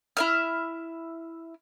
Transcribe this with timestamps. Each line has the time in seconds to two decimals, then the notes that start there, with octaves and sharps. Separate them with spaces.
0.17 E4 E5 F6